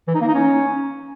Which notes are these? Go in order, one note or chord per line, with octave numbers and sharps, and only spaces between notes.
E3
D#4
A#3
D#4
C#4